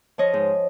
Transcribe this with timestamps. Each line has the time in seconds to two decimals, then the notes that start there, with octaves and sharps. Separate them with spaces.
0.18 F3 C#5 D#5
0.34 G#2